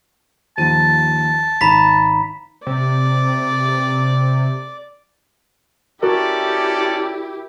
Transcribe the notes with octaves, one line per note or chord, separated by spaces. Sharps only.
D#2 F3 A5 D#7
G#1 A#5 B5 B6
C3 D5
C#4 E4 F#4 G4 A4 A#4 D5